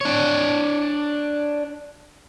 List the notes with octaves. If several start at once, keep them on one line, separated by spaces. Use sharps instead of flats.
D4 C#5